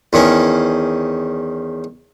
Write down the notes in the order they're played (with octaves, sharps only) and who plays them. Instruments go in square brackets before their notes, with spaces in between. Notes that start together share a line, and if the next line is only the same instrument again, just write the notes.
[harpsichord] E2 D#3 C#4